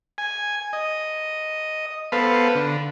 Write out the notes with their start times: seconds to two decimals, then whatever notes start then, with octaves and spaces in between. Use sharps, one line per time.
0.18 G#5
0.73 D#5
2.12 B3 A4 B4 C5 F5
2.55 D3